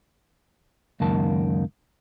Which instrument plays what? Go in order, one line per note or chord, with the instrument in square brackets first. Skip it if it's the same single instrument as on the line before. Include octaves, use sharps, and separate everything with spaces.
[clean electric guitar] C#2 F#2 D#3 A#3 A5